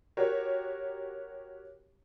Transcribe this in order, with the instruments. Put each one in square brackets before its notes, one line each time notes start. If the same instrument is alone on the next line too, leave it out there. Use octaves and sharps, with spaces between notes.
[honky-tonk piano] F#4 G4 A#4 C#5